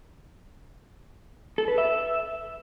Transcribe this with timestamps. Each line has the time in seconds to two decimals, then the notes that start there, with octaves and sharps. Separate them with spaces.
1.58 A4
1.68 B4
1.78 E5